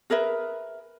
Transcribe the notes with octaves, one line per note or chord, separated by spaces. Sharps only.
G#4 A#4 B4 E5